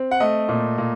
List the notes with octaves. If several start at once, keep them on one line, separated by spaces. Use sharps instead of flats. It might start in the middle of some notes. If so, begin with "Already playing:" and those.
Already playing: C4
F#5
A3 D#5
A#2
A#2